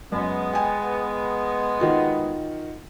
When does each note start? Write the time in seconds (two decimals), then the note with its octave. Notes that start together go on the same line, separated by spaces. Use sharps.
0.12 F#2 G#3 B3
0.53 G5 G#5
1.80 D#3 F4 F#4